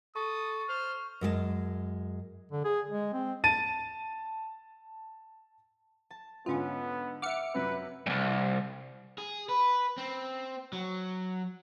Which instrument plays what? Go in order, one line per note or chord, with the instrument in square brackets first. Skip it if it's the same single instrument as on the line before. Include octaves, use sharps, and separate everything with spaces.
[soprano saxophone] A4 [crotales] C#6 [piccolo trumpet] D#6
[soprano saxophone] C5 [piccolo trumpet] F6
[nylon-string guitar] F#2 G#3 F#4 A5
[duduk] D3
G#4
G#3
C4
[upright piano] A5 A6 D#7
[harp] A5
[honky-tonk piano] G#2 D3 [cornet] B3 [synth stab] C#4 F4
[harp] E5 F#5 [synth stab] D6 F6 C#7
[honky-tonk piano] F#2 C3 F#3 [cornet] B4
[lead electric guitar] C2 G2
[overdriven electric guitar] G#4
B4
C4
F#3